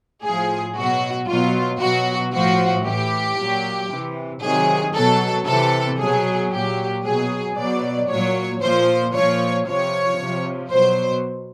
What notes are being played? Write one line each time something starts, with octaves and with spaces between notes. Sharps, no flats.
A2 F3 G#4
B2 F#3 F#4
B2 F#3 F4
B2 F#3 F#4
A2 F3 F#4
A2 E3 G4
A#2 F#3
C3 E3
C3 D#3 F#3 G#4
B2 F#3 A4
C3 E3 A4
B2 F#3 G#4
A#2 F#3 G4
B2 F#3 G#4
B2 F#3 D5
A#2 F#3 C#5
A#2 F3 C5
A#2 F3 C#5
C3 F3 C#5
C3 F3
B2 F#3 C5